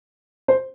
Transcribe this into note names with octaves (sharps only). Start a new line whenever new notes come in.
C5